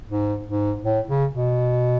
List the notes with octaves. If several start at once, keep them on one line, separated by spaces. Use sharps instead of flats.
G#2
G#2
A2
C#3
B2